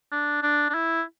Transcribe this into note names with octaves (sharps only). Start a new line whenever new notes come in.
D4
D4
D4
E4